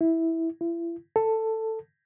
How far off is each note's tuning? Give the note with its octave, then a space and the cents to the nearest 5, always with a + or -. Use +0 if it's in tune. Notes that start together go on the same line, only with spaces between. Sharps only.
E4 -10
E4 +35
A4 +10